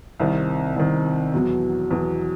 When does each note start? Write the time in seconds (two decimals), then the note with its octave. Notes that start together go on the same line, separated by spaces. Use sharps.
0.20 C2 C3 D#3
0.76 C2 C3 D#3
1.34 E2 B2 F#3
1.91 E2 B2 F#3